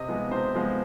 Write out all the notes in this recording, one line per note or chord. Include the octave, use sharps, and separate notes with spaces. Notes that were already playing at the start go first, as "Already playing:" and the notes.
Already playing: C3 D#5
F3 G#3 B3
C3 C5
F3 G#3 B3